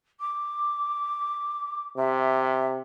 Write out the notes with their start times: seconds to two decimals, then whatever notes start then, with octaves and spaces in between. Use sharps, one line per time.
0.20 D6
1.98 C3 E5